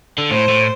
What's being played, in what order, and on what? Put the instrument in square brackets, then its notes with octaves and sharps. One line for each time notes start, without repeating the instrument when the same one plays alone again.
[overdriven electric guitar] D3
[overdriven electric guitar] A2 [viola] C5
[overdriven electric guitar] A2